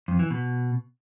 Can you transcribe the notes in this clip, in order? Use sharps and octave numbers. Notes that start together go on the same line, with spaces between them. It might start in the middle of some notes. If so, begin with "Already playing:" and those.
F2
E3
B2